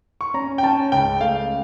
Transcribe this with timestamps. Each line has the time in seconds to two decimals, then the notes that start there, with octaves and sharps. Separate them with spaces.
0.21 C#6
0.34 C#4 A#5
0.58 G5
0.63 C#4 A5
0.92 C#2 G5
1.21 A3 F5